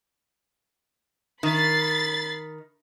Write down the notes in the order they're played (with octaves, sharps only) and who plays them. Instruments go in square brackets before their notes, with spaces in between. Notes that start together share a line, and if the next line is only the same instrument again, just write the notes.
[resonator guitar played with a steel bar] D#3 [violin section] B5 A6 C7